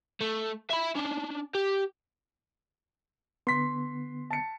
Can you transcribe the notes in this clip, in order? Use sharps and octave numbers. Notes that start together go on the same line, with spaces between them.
A3
E5 B5
C#4 D4
G4
D3 B3 C6 B6
A5 C#7